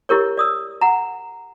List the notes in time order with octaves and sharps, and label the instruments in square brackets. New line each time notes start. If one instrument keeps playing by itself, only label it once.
[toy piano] E4 G4 A#4 C#5
D5 D#6 E6
F#5 A#5